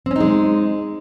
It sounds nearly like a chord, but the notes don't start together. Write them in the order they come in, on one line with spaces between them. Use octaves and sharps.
C4 C#4 D#4 G#3